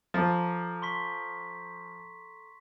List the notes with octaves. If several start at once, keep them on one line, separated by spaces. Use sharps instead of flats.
F3 A4 A#5 D6
C6 C#6 B6